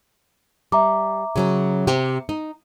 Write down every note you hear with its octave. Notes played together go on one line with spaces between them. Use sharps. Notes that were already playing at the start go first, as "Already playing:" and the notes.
G3 E5 A#5 D6
C#3 F#3 C#4
C3 G4
D#4